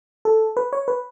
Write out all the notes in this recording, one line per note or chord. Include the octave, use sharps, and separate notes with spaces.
A4
B4
C#5
B4